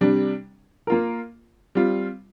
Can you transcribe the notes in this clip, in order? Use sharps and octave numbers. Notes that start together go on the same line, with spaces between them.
C3 G3 D4
A#3 F4 A#4
G3 C4 F4